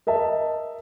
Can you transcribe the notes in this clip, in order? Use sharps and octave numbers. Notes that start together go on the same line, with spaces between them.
A#4 D#5 E5 A5